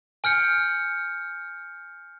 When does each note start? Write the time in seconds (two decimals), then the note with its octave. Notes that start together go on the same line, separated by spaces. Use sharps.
0.24 G#5 F6 G6 C#7